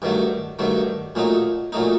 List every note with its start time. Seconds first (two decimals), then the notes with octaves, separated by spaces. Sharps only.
0.02 G2 D#3 F#3 A3
0.59 G2 D#3 F#3 A3
1.15 A#2 F#3 A3 D#4
1.72 A#2 F#3 A3 D#4